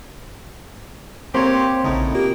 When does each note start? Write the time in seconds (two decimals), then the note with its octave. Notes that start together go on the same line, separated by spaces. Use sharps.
1.35 A#3 C4 G4 C5 C#5 G5 C6
1.84 A#1 A2 C#3 D#4
2.14 A#3 F4 G4